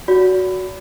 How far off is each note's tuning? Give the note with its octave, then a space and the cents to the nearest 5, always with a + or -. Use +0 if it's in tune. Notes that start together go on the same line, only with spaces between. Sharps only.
F#4 +0 D5 -45